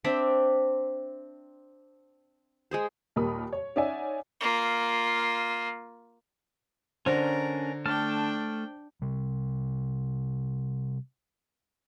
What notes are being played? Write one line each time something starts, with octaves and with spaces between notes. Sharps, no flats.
C4 D4 E5 G5
G#3 G#4 C5
D#2 A#2 G3 A#4 B5 D#6
C#5
C#4 D#4 D5 E5 F#5 G#5
A#3 F4
D3 C#4 D4 A#4 C5 A#5
A3 D4 G5 A5 F6
C3 G3